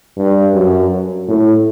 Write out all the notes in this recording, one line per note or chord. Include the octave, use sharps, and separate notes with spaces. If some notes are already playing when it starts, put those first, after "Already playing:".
G2
F#2
A2